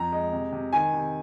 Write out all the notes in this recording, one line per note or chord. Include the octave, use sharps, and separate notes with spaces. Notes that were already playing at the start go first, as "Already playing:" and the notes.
Already playing: F2 A#5
G#3
C3
C3
D#3 G#5
C3